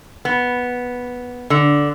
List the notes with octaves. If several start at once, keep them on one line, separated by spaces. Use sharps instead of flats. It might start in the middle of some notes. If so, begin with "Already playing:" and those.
B3
D3